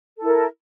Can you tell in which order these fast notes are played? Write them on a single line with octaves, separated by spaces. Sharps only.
A4 E4 A#4